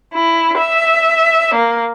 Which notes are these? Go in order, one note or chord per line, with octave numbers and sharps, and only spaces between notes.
E4
E5
A#3